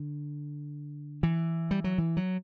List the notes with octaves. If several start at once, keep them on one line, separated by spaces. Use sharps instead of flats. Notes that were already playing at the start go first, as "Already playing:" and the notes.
Already playing: D3
E3
G3
F#3
E3
F#3